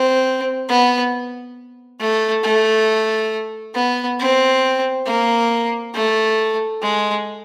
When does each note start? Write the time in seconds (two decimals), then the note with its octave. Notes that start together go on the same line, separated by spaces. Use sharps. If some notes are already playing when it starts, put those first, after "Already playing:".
Already playing: C4
0.69 B3
2.00 A3
2.44 A3
3.75 B3
4.20 C4
5.06 A#3
5.94 A3
6.82 G#3